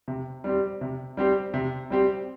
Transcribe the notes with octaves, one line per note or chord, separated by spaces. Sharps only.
C3
G3 C4 G4
C3
G3 C4 G4
C3
G3 C4 G4